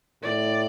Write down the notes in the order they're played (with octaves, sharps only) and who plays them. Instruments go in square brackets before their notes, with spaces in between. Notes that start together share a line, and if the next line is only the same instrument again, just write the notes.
[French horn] A2 [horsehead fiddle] D5